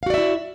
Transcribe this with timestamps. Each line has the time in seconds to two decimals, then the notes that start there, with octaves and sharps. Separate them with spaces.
0.03 F5
0.06 F#4
0.10 D5
0.14 E5
0.18 E4